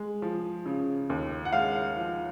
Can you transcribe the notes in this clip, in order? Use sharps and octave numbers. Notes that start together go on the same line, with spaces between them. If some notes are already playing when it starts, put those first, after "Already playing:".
Already playing: G#3
F3
C#3
D#2
F#5
G#3 F5
F3